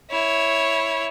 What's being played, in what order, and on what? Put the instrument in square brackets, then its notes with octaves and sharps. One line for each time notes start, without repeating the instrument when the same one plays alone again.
[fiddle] E4 C#5